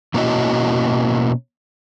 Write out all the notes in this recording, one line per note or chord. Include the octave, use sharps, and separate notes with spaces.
B2 A#3 C#4 E4 F#4 D#5